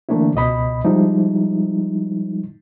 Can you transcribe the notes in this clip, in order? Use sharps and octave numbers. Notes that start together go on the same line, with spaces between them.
D3 E3 A3 A#3 D4 E4
C#2 B2 D#5 B5
F3 G3 G#3 D#4 E4